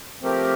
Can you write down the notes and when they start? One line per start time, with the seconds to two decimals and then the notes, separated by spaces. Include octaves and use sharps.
0.21 F3 A3 C4 G4 A#4